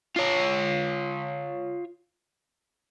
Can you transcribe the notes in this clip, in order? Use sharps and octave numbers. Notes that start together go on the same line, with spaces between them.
F4 C#5